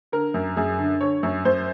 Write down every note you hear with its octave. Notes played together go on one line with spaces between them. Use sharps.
D3 A#4
F#2
F#2 G#4
D3
D3 C#5
F#2 C#5
F#2 C5